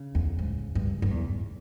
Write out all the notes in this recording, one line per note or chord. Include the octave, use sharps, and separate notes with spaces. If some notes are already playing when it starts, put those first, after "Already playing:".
Already playing: C#3
E2
G#2
G2
G2
E2